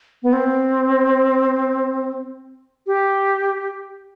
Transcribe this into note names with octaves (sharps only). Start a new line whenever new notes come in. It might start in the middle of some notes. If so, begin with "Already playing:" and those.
B3
C4
G4